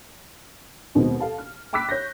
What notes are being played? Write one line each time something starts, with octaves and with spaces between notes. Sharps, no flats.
D#2 B2 D#3 G#3 C4
A4 F5 A5
F6
G5 B5 D6 E6 F#6 B6
C#5 G6 A#6